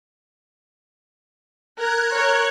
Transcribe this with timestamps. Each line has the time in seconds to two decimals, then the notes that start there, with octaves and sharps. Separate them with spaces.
1.76 A#4 F#6 G#6
2.12 A#4 C#5